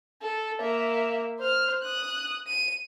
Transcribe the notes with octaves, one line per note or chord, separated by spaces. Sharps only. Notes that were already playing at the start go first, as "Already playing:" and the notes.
A4
A#3 E5
C5 F6
D#6 F#6
D#7